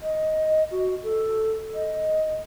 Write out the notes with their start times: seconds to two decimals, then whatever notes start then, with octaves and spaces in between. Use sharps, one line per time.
0.02 D#5
0.71 F#4
1.03 A4
1.74 D#5